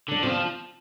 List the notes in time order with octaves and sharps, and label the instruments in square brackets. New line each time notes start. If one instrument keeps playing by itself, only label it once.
[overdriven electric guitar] D3 [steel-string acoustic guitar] D4
[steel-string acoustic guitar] C3 C4 [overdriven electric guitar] F3